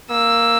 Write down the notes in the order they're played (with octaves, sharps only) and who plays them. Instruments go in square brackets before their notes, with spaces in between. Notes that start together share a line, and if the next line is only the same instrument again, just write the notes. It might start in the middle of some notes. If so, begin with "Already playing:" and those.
[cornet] A#3 [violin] E6